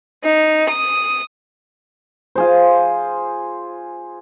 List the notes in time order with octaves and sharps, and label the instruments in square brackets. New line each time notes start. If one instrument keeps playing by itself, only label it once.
[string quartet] D#4
D#6
[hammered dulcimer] F4 G#4 C5